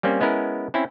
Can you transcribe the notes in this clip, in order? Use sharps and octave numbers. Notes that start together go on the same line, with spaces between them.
G3 A#3 C4 C#4
G#3 B3 C#4 E4 A#4
C4 C#4 E4